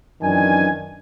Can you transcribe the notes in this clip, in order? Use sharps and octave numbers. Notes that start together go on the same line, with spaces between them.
F#2 D#3 E3 D4 G#5